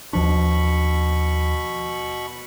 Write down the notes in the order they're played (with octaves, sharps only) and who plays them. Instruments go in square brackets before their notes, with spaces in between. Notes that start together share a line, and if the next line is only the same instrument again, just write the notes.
[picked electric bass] D#2 F3 D4 [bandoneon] B2 B5 C#6